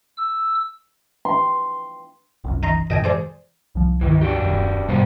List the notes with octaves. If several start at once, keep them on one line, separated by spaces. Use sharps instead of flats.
E6
C6
G1 C2 F#2
D#4 A#5 C6
F#2 A#2 C#3 D#5 G5 G#5
G#4 C5 D5
C2 F3
C#2 G2 D#3 E3
D4 F#4 G4
D#1 F#2
G#2 B2 G3 B3 C5